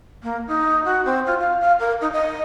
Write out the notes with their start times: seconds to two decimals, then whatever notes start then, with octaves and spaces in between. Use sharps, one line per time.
0.23 A#3
0.47 D#4
0.85 F#4
1.05 C4
1.26 F4
1.39 F5
1.61 F5
1.79 A#4
2.01 D#4
2.12 D#5